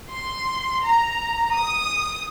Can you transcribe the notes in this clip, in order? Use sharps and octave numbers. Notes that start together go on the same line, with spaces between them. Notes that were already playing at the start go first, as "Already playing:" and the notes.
C6
A#5
D#6